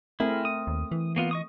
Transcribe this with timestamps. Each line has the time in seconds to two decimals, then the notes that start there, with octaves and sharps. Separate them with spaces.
0.20 A3 C4 E4 G#4 A#4
0.45 D#6
0.67 D#2
0.92 E3
1.16 A#3 B3 F4
1.31 D#5 C#6 D#6